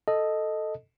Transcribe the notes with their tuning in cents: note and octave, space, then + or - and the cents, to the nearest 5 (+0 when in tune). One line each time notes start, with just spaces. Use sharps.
A4 +0 D#5 +0